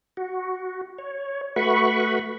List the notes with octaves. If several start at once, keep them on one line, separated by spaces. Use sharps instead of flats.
F#4
C#5
A3 F#4 B4 B5 C#6